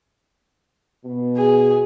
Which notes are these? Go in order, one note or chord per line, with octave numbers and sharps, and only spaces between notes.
B2
G#4